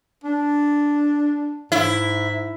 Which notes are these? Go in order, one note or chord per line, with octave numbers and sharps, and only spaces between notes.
D4
G#2 E4